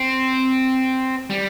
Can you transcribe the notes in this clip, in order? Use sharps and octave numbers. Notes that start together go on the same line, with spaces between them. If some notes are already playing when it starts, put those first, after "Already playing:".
Already playing: C4
G3